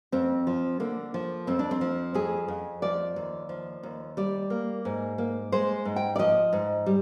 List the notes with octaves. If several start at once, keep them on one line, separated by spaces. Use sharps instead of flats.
F2 C4
F3
D3 A#3
F3
F2 C4
D4
C4
F3
F2 G#4
F2
F3 D5
D#2
F3
D#2
G3 D5
A#3
G#2
A#3
G#3 C5
G#2
G5
D5
F3 D#5
G#2
G3